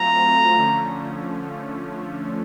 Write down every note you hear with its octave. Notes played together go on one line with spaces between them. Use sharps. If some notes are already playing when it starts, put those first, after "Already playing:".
Already playing: F#3 A3 C4 F4 A#5
D3 F3 A3 C#4